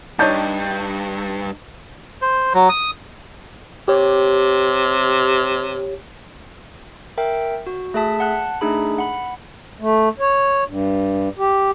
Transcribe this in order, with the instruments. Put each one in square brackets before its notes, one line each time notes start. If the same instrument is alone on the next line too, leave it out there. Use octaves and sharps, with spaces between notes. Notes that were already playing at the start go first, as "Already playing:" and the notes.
[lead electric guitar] G2 [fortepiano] D4 D#4 C#5 [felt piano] A5 G6
[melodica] C5
F#3
D#6
[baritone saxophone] C3 [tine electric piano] G4 C#5
[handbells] A#4 E5 G5
F#4
A3 G#4 E5 A5 B6
F#5 A5 F#6
A3 D4 D#4 G#4 B5
F#5 B5
[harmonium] A3
C#5
G2
G4